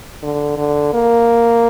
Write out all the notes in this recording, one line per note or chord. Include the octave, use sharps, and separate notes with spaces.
D3
D3
A#3